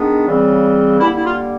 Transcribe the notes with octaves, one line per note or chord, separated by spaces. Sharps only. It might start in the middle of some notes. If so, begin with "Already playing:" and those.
Already playing: D#3 G#3 B3 D4
C#3 E3 G3 C4
D3 G3 A#3 E4
E4
F4